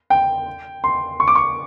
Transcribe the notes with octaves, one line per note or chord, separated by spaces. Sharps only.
G5
C6
C#6
D6
C#6